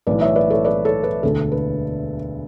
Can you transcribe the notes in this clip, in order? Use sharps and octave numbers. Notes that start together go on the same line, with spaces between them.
B1 A2 E3 B4 D5
C#5 E5
B4 D5
A4 C#5
B4 D5
A4 C#5
B4
E1 D2 D3 A4
B4